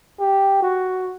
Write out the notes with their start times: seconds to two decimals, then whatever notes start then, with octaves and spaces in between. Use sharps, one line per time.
0.20 G4
0.62 F#4